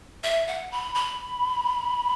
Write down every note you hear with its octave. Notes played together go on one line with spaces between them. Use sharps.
E5
F#5
B5
B5